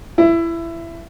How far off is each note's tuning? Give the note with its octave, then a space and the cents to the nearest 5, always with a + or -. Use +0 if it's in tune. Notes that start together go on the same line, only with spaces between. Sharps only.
E4 +20